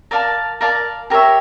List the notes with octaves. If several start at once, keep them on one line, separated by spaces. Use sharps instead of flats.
A#4 D5 F5 A5
A#4 D5 F5 A5
G4 A#4 C#5 E5